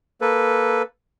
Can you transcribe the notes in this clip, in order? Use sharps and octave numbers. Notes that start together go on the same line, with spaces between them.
A#3 A4 B4